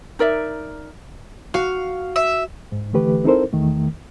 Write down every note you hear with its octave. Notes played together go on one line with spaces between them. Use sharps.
D#4 A#4 D5 E5
F#4 F5
E5
G#2
D3 E3 A3 G4 B4
C4 D#4 E4 A4 A#4 C5
E2 D#3 A3